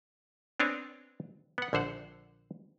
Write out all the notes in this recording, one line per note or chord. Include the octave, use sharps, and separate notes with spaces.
B3 C4 D4 C#5 G#5
B3 F#5
A#1 D3 C5 F#5